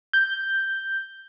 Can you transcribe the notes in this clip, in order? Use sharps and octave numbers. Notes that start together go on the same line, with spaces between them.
G6